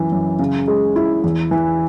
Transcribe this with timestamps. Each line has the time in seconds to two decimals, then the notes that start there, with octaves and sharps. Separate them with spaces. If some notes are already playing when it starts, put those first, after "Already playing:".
Already playing: F#2 E3
0.12 F#2
0.39 C#3
0.68 G#3
0.96 E4
1.24 E2
1.51 E3